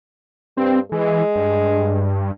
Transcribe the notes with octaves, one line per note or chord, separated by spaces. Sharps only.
G2 C4
E3 G#3
G2